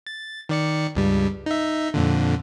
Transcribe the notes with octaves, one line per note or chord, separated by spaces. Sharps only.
A6
D#3 D5 C#7
C#2 G2 G3
D#4 E5
F2 A#2 D3